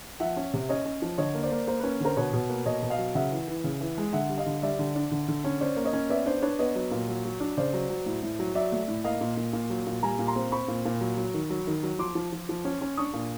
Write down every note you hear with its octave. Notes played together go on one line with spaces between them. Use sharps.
F3 E5 F#5
C#4
C3
C#4 C#5 D#5
C#4
F3
D3 C#5 D#5
A#3
C5 D5
A#3
A#3 A#4 C5
C#4 B4
D3 A#4 C5
B2 B4 C#5
B2
A#3
B2 C#5 D#5
B2
D#5 F5
F#3
C#3 E5 F#5
E3
E3
C#3
E3
G#3
D3 E5 F#5
G3
D#5 F5
D3
G3 D5 E5
D3
D4
D3
D3
C#4
C#4 C5 D5
A#3
C#5 D#5
C#4
B3 D5 E5
D4 C5 D5
D4 B4 C#5
B3 C#5 D#5
F#3
A#2
F#3
F#3
D4
C#3 C5 D5
F#3
F#3
A2
A2
F#3
F#3 D5 E5
A3
A2
A#3 D#5 F5
A#2
A#2
A#2
F#3
A#2
G3 G#5 A#5
A#2
A#5 C6
C4
C4 B5 C#6
A#2
A#2
F#3
F#3
D#3
F#3
D#3
F#3
F3 C6 D6
F3
F3
F3
C#4
C#4
D4 C#6 D#6
A#2